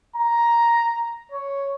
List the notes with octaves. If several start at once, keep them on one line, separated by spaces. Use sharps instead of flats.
A#5
C#5